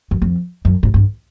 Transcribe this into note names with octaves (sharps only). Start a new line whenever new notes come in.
F#2
F2
F#2
G#2
G2